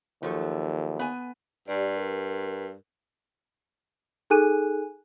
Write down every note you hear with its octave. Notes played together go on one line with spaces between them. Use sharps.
D#2 F3 F#3 A4
B3 G#5
G2 G4 D5
A#4
D#4 G#4 A4 G#5 F#6 D#7